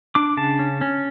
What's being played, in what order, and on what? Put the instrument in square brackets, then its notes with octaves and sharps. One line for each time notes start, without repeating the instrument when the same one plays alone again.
[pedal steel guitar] D4 D6
C#3 A5
C#4
C#4